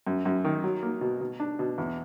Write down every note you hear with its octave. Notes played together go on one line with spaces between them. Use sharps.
F#2
F#2
D#3
F#3
A#3
B2
B2
D4
B2
E2